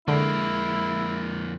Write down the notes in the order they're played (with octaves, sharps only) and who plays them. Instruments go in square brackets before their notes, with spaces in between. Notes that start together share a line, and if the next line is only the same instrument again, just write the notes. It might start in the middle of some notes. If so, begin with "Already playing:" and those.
[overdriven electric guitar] F2 A#3 [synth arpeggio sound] D3 [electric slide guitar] G#3 [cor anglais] E4